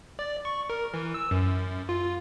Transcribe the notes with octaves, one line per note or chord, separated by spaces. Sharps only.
D5
C#6
A#4
E3
E6
F#2
F4